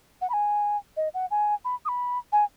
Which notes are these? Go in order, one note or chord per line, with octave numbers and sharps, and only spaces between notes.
F#5
B5
G#5
D#5
F#5
G#5
B5
D#6
B5
G#5